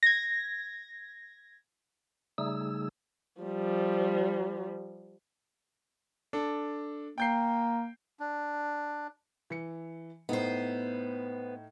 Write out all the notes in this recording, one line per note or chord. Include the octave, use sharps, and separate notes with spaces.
G#6 A#6
C#3 G3 A3 D#4 G#4 E6
F3 G3
D4 A4
A#3 G5 G6 C7
D4
E3 C#7
A2 B3 D#4 C5